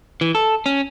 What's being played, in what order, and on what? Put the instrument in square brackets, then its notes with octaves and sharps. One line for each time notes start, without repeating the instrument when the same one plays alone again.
[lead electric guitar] E3
A4
C#4